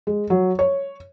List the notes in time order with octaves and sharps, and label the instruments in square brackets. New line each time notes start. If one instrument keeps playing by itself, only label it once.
[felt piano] G#3
F#3
C#5